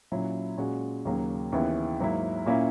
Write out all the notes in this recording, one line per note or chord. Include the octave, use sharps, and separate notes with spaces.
A#2 F#3 C#4 E4
A#2 G#3 C#4 F#4
D#2 C#3 F#3 A#3
D#2 C#3 E3 B3 E4
G#2 F#3 A#3 E4
A#2 A#3 C#4 E4